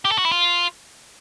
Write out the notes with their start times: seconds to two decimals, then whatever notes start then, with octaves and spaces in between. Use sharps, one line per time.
0.05 G4
0.11 A4
0.18 F#4
0.25 E4
0.32 F4